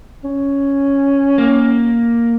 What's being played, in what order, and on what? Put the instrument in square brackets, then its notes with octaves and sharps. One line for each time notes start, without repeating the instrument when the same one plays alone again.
[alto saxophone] C#4
[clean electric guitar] A#3